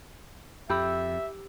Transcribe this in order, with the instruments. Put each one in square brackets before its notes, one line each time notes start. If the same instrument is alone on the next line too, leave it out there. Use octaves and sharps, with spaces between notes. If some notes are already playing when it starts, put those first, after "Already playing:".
[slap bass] F2 [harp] G4 B5 E6 [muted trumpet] E5